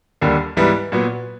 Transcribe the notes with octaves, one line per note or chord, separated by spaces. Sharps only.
D#2 D3 G3 A#3
G#2 E3 G3 B3 E4
A#2 F#3 B3